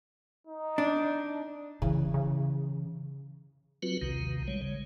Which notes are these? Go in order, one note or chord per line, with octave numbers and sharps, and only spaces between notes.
D#4
D4
C#3 E3
C#3
F#3 C4 F4 F#4 B4
A#1 D#2 C3 D#3
G3 G#3 C#5
C#3